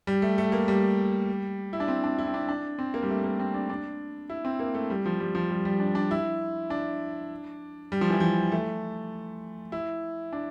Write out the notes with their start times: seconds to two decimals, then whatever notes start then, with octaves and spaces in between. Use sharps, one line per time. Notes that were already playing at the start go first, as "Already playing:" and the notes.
0.07 G3
0.22 A3
0.38 A3
0.52 A#3
0.68 G3
1.73 E4
1.80 D4
1.88 C4
2.04 D4
2.19 E4
2.27 C4
2.34 D4
2.49 D4
2.79 C4
2.94 A#3
3.03 G3
3.09 A3
3.24 A#3
3.39 C4
3.54 D4
3.70 D4
4.30 E4
4.45 C4
4.59 A#3
4.74 A3
4.90 G3
5.06 F3
5.20 G3
5.35 F3
5.50 G3
5.65 G3
5.80 D4
5.95 D4
6.11 E4
6.70 D4
7.92 G3
8.01 F3
8.10 E3
8.20 F3
8.52 A3
9.72 E4
10.33 D4